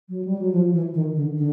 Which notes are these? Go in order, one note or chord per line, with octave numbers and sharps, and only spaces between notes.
F#3
G3
F#3
F3
E3
D#3
D3
D3